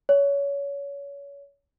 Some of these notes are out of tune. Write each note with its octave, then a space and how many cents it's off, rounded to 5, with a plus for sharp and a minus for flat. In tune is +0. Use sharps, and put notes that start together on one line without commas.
C#5 +25